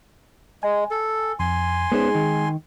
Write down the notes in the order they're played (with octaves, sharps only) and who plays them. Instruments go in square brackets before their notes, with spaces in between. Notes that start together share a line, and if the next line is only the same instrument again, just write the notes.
[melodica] G#3 [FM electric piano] G#5
[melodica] A4
[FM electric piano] F2 [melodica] G#5 C6
[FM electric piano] G#3 D#4 G#4 [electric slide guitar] B3 C#4 C5
[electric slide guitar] D#3